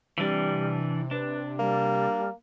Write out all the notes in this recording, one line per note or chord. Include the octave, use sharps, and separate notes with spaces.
C3 E3 G3 D4
D4 B4
G3 A#3